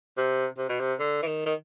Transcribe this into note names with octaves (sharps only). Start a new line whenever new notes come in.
C3
C3
B2
C3
D3
E3
D#3
D#3